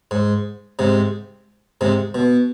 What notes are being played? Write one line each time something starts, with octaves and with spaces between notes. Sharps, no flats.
G#2
G#2 C3
G#2 C3
B2